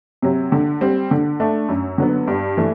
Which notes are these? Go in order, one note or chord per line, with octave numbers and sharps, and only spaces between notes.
C3 F#3
D3
G3 C4
D3
A3 D4
F#2
D3 F#3 B3
G2
E3 A3